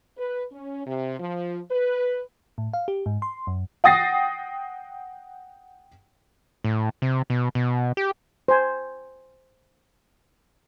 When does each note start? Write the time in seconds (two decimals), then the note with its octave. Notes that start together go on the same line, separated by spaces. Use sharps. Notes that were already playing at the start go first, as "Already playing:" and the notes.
0.17 B4
0.52 C#4
0.86 C3
1.19 F3
1.70 B4
2.58 A2
2.74 F5
2.88 G4
3.06 G#2
3.22 C6
3.47 F#2
3.84 F#5 G5 D#6 A6 A#6 C7
6.64 A2
7.02 C3
7.30 B2
7.55 B2
7.97 G4
8.48 C5 G#5